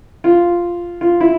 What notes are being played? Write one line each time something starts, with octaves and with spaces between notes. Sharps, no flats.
F4
F4
E4